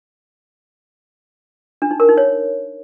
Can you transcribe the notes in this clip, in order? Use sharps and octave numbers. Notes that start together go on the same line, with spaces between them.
D4
D#4
A#4
D#4
C#5